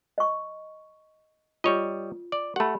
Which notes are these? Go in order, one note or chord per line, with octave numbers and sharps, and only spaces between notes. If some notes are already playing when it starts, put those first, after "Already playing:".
D#5 C#6
G3 F4 C#5 D#5
D5
A3 G4 F#5 B5